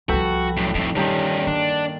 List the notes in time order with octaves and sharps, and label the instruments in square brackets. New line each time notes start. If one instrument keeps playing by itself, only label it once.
[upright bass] C2 F3 [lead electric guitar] F#4 [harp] A4 B4 G5
[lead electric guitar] F#2 A2
[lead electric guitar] F2 A2 [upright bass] D#4
[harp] G2 D#3 G5 [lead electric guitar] G3 C#4
[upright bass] A#3 [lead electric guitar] D4